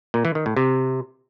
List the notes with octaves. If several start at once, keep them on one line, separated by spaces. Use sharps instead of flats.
A#2
E3
D#3
A2
C3